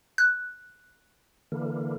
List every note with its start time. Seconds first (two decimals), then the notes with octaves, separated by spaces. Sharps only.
0.18 F#6
1.52 D3 E3 A#3